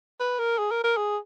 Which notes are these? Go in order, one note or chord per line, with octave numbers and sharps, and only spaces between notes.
B4
A#4
G#4
A#4
A#4
G#4